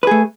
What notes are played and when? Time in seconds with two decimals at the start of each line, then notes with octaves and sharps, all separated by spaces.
0.03 B4
0.07 G#4
0.11 A3